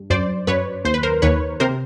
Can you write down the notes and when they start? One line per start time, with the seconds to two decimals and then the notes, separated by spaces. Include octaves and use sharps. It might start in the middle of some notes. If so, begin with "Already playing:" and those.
Already playing: G2
0.10 F#2 C5 D5
0.47 F#2 B4 C#5
0.85 D#2 C5
0.94 B4
1.03 A#4 C5
1.22 D#2 B4 C#5
1.60 C3 A#4 C5